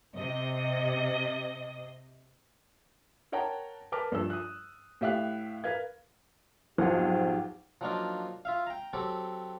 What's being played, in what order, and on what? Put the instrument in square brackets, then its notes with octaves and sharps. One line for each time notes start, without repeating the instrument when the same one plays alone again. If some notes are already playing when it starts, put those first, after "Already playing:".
[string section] C3 D#5
[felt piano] A#4 C#5 F#5 G5 A5 A#5
A#4 B4 A5 D6 F6
G2 F3 E6
D#6 F#6
A2 G4 E5 F5 F#6
A#4 B4 F5 G#6
[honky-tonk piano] B1 F2 [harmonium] G#2 G4 [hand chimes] C5 F#5
[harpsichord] F3 F#3 A#3 D4 D#4 F4
F4 E5 F5
G5 A#5
F#3 C4 G4 A4